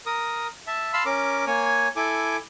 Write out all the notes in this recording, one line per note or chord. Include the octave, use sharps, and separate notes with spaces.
A#4 D#6
E5 A5
F5 A5 B5 C6 E6
C#4 A#4 D6
A#3 C#5 G#5
E4 A4 G#5 D6